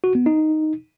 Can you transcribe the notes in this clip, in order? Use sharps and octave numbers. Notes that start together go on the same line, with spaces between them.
F#4
B3
D#4